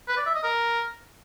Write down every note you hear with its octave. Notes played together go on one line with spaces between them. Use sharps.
B4
D5
E5
D#5
A#4